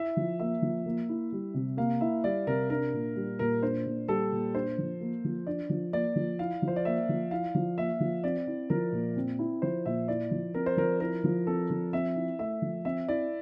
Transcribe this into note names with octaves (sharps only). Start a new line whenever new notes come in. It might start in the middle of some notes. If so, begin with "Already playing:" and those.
Already playing: E4 E5
F3
A#3 E5
F3
A#3
E4
G3
C3
A#3 F5
E4 E5
G3 D5
C3 A#4
D4 A#4
A#2
G3
A#2 A#4
D4 C5
A#2
G3 A4
A#2
D4 C5
F3
A#3
F3
D4 D5
F3
A#3 D5
F3
E4 F5
F3
C5
D5
A#3 E5
F3
E4 F5
F3
A#3 E5
F3
C4 D5
E4
F3 A#4
A#2
C4
E4
F3 C5
A#2 E5
E4 D5
F3
C4 A#4
C5
F3 A#4
E4 A#4
F3
C4 A4
F3
C4 E5
E4
A3 E5
F3
C4 E5
E4 D5